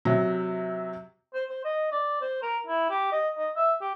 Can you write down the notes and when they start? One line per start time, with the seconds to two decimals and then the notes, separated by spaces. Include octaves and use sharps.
0.05 C3 F#3
1.34 C5
1.50 C5
1.65 D#5
1.92 D5
2.21 C5
2.42 A#4
2.67 E4
2.90 G4
3.12 D#5
3.38 D#5
3.56 E5
3.81 G4